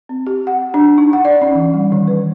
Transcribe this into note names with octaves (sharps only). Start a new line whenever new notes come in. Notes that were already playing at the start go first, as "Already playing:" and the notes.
C4
G4
F#5
D4
D#4
F#5
D5
C#4
E3
G3
D#3
B4